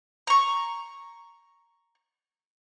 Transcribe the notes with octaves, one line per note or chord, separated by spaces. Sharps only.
A#5 C#6